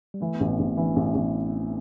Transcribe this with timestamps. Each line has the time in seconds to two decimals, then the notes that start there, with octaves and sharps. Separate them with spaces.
0.14 G3
0.21 E3 A3
0.35 B3
0.40 A1 C4
0.49 B3
0.59 A1 C4
0.77 E3 D4
0.96 A1
1.06 C4
1.15 A1